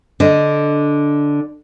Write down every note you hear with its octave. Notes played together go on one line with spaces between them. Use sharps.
D3 D4 D#5